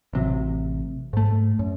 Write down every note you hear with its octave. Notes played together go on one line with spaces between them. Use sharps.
A1 C3 F#3
G#2 A3
F#2